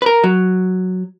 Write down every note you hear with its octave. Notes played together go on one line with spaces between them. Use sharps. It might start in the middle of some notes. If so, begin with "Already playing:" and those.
A#4 B4
F#3